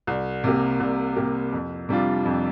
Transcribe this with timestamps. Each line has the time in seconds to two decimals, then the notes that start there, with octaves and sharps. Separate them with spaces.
0.07 C2
0.44 C3 A#3 G4
0.80 C2
1.16 C3 A#3 G4
1.53 F2
1.89 C3 G3 D4 F4
2.25 F2